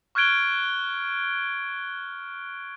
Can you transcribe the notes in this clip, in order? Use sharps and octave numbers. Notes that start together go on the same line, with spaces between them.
C#6 F6 F#6 G#6 D7 G7